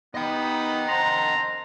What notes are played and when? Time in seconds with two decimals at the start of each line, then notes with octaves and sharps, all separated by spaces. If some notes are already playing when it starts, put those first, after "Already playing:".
0.15 B3 D#4 G4 D#5 G5 B5
0.88 C4 C5 F#5 A5 A#5 C6